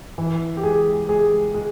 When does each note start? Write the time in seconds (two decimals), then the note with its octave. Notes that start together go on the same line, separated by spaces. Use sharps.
0.18 E3
0.57 G4
0.63 G#3 G#4
1.09 G#3 G#4
1.54 G#3